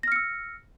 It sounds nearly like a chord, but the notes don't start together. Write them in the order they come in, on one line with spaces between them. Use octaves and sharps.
A#6 F6 C#7 E6